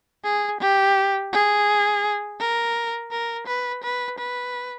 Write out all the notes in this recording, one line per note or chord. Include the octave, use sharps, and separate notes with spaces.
G#4
G4
G#4
A#4
A#4
B4
B4
B4